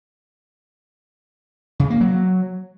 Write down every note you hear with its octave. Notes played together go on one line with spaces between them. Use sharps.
C#3
A#3
F#3